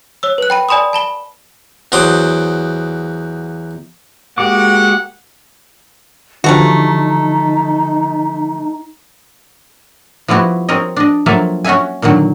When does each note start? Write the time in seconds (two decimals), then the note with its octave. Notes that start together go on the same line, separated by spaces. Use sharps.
0.23 C#5 E6
0.38 B4 F#6
0.50 G5 B5 D#7
0.69 D5 G#5 B5 C6 D#6
0.93 A5 B5 G7
1.92 E2 F#3 C5 D6 D#6
4.38 G#3 A#3 F#4 G4 F#5 D6
6.44 D3 E3 F3 G3 A3 D#4 F#4
10.28 F3 G3 B3 E4 F#4
10.69 C4 A#4 C#5 D#5
10.97 D4 D#5
11.26 F3 F#3 A#3 A4 E5 G#5
11.64 C#4 F#4 C#5 E5 G#5
12.02 A#2 D3 D#3 F#3